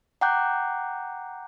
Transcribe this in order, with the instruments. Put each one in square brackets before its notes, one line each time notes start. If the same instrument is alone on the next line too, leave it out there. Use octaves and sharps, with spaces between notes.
[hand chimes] F#5 G5 A#5 D6 F#6 G6